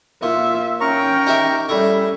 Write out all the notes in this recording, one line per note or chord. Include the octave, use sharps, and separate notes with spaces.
A#2 F4 E5
C#4 A#4 G5 A#5 C#6
D#4 G4 E5
G3 A3 C#4 E4 E5